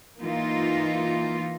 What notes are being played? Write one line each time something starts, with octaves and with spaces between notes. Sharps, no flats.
E3 A#3 D#4 F4